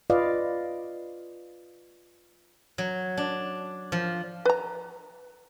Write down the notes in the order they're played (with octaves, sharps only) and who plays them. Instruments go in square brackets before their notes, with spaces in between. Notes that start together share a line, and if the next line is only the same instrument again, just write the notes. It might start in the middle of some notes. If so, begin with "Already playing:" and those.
[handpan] F4 B4 D5 D#5 F5
[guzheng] F#3
D4
F3
[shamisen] B4 A#5